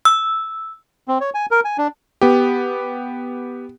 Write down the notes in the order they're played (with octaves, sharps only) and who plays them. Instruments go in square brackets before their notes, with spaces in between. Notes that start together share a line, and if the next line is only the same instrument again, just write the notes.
[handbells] E6
[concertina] C4
C#5
G#5
A#4
G#5
D4
[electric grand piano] B3 G4